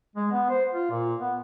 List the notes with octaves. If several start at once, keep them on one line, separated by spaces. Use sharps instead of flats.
G#3
B3
C5
F4
A#2
B3